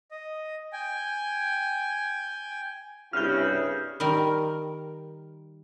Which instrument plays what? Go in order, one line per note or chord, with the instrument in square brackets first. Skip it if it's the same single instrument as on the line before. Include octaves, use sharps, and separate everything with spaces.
[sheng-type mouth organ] D#5
G5 G#5
[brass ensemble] C2 G2 [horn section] C#3 F#4 [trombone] E4 [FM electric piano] F6 G6
[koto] D#3 G3 A#4